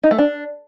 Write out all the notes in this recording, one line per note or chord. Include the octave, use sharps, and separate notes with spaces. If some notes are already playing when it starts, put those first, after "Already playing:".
D#4
A3
D4